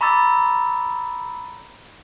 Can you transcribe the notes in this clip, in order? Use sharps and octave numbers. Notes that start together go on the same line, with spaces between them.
A#5 B5 C#6 D6 E6 A6